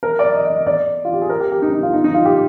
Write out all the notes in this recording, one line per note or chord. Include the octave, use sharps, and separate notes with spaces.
A#4
D5
D#5
D#5
D#5
D5
F4
G4
G#4
A#4
G4
G4
D#4
D#4
F4
D#4
D#4
F4
G4